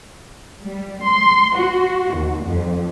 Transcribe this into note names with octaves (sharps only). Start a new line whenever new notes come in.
G3
C6
F#4
D#2
F2